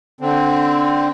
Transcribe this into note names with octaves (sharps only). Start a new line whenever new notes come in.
D3 C4